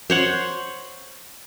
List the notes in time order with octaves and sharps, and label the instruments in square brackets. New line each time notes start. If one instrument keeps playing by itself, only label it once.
[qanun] C5 C#5 F#5